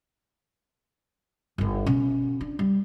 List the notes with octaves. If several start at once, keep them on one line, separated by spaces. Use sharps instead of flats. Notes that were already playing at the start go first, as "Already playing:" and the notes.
G1 D#3
B2 C#4
D4
G3